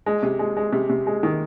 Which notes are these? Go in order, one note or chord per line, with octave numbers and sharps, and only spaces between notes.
G#3
C3
G#3
G#3
C3
C3
G#3
D#3